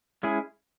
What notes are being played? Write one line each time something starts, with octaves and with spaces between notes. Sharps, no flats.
G#3 C#4 E4 G#4